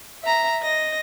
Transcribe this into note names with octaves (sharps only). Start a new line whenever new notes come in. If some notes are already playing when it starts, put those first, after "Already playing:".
E5 A#5
D#5 A#6